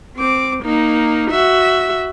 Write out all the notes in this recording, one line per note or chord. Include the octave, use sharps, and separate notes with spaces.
C4 D6
A#3 D#4
F#4 E5